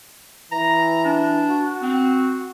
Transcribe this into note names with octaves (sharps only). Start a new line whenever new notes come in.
E3 A#5
D4
F#4
C4